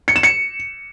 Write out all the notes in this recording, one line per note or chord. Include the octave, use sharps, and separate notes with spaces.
C#7
E7
C#7